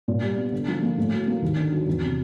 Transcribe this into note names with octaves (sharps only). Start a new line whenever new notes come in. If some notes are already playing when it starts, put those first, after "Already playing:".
A#2
G3
B3
D3
F3
A#3
A2
F#3
A#3
D#2
D3
F#3
E2
C3